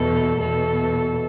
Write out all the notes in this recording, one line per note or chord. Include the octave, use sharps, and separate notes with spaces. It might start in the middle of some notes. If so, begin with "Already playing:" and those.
Already playing: E2 B2 A4
E2 B2 A4